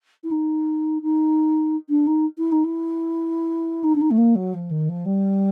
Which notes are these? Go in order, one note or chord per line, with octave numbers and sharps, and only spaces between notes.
E4
D#4
D#4
D4
D#4
E4
D#4
E4
D#4
D4
D#4
A3
A#3
F#3
F3
D#3
F3
G3